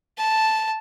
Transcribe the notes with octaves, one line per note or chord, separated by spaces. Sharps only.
A5